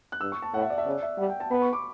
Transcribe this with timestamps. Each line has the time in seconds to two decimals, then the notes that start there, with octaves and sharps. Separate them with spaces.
0.12 F#6
0.21 G2 E6
0.32 C#6
0.42 A5
0.54 A2 F#5
0.62 E5
0.70 D5
0.78 E5
0.86 C#3 D5
1.03 E5
1.18 G3 F#5
1.30 G5
1.40 A5
1.51 B3 B5
1.62 C#6
1.73 D6